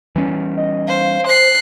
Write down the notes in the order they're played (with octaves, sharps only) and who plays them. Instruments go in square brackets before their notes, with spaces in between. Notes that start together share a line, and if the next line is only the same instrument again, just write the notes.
[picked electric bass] E3 G3 C#4
[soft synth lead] D#5
[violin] C5 [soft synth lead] F5
[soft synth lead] C5 [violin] F#6 C7